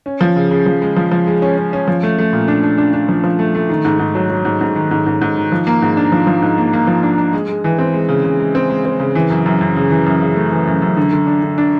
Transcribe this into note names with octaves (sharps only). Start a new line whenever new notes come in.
C#4
F3
C#3
C#3
F3
G#3
F3
F3
G#3
C#4
C#4
C#4
F3
A3
A3
A#2
D4
D4
D4
D4
F3
F3
A3
A3
D#3
G#2
G#2
F#3
F#3
G#2
G#2
D#3
G#2
G#2
G#2
D#3
F3
A#3
G#2
D4
F3
F3
G#2
A#3
A#3
F3
D4
D4
G#3
G#3
E3
C4
G#3
C#3
C#3
G#3
C4
G#3
C4
C#3
E3
F#2
F#2
F#2
C#3
E3
F#2
C#3
A3
E3
F#2
F#2
D3
D3
D4
D3
D4